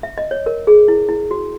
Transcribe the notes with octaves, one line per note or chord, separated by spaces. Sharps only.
E5
D#5
C#5
A#4
G#4
E4
E4
F#4